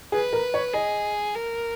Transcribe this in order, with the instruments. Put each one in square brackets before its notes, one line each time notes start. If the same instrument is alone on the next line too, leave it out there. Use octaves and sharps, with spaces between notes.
[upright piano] G#4 [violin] B4
[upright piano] A#4
C#5
[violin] G#4 [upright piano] D#5
[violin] A#4